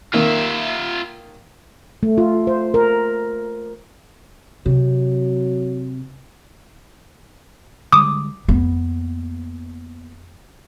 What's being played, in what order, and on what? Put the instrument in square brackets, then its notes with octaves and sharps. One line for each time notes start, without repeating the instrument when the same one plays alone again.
[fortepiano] D#3 A#3 [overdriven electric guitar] F4 E5
[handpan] A3
F4
C5
A#4
[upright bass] C3 [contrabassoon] F#3
[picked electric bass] D3 G3 G#3 [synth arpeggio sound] D6 D#6
[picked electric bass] F2 [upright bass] A#3 B3